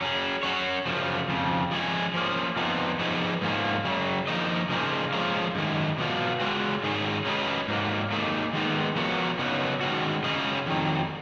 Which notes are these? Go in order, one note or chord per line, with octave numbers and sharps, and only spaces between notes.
F#3 C#4 G#4
F#3 C#4 F#4 C#5
F#2 C#3 F3
F2 C#3 F3
F3 G#3 C#4 G#4
F3 A#3 C#4
F2 F3 B3 D#4
F3 B3 D#4 G#4 C#5
G#2 F3 A#3 C#4
F#2 C#3 F#3
F3 A#3 D#4 A#4 D#5
C#3 F3 A#3 D#4 G#4
F3 G#3 C#4 F4 A#4
F#2 D#3 G#3
B2 F#3 B3 F4
C#3 G#3 C#4 F#4
G#2 D#3 G#3 C#4 G#4
F#3 C#4 G#4 B4 D#5
G#2 F#3 A#3
F#3 A#3 D#4 G#4
D#3 G#3 B3 D#4
F3 B3 F#4 A#4 C#5
C#3 F#3 B3 D#4
D#3 G#3 C#4 F#4
C#3 F#3 C#4 G#4 D#5
F2 D#3 F#3